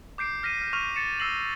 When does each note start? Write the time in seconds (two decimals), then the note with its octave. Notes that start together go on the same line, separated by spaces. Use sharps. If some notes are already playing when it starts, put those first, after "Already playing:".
0.18 D6 G6 C7 D7
0.43 F6 A#6 B6 D#7
0.61 F6
0.73 C#6 F6 G6 D#7 F7
0.96 A6 C#7 E7
1.20 E6 A#6 C7 F#7